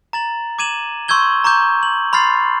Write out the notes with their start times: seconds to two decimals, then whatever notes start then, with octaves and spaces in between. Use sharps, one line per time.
0.13 A#5 A6 F#7
0.59 D6 G#6 D#7 E7 F#7
1.08 C6 C#6 E6 G6 G#6 G7
1.44 A#5 C#6 D6 G6
1.83 F#7
2.13 B5 C6 F6 A6 C7